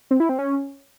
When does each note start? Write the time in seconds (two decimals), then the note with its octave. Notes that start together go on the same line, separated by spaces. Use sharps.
0.11 C4
0.20 E4
0.29 C4
0.39 C#4